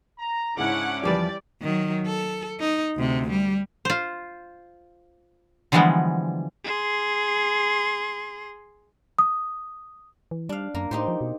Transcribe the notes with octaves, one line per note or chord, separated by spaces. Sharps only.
A#5
G#2 C#3 C#4 D4 E4 F#5 D6
E2 E3 F3 G3 G4 B4 D5
D#3 F#3
A4
D#4
D2 C3
G3
F4 C5
D3 E3 F3 G3 G#3 B3
G#4 C6
D#6
E3
G3 D4 F5
F#2 A#3
A2 D#4 G4 C5
F3
B2